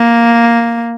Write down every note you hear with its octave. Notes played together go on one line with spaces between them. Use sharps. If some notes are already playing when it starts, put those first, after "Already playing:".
Already playing: A#3